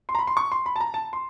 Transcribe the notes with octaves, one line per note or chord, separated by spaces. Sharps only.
C6
A#5
B5
C6
C#6
C6
B5
A5
A#5
A5
C6